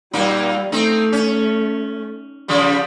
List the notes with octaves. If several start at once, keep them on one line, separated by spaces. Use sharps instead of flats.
A#2 G3 A#3 D#4
A3 C4 D#4
C#4
C#3 F3 G3